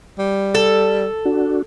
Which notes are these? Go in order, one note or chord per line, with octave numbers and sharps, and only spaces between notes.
G3
A4
D4 F#4